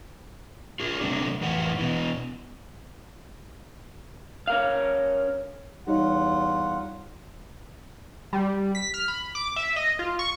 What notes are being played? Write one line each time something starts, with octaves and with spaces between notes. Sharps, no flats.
F4 G#4
C3 F#3 A3 C4 D4
F2 A2 E3 F#5
B2 E3
C#4 A#4 F5
E2 G3 D#4 F4 C#5 F#5
G3
B6
F6
B5
D6
E5
D#5
F4
C#6